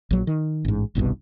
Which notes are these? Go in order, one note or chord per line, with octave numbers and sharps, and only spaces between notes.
A#1 F#3
D#3
A1 G#2
G1 C2 G2 B2